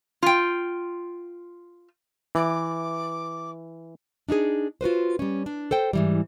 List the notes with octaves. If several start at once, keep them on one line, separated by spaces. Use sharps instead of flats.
F4 G5
E3 D6
D4 D#4 F#4 G#4
F4 F#4 B4 C5
G3 C#4
D4
A4 C5 G5
G#2 E3 G3